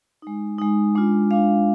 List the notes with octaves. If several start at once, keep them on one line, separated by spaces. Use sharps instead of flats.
G#3 D#4
G#3 D#4
G#3 D4 F4
G#3 D4 F4 F5